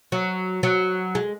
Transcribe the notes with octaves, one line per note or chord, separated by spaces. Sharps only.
F#3
F#3
G#3